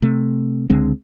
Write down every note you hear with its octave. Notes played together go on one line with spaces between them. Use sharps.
C3 A3
C#2 D3 G#3 C4